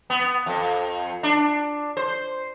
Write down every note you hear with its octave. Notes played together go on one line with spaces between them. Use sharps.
B3
F2
D4
C5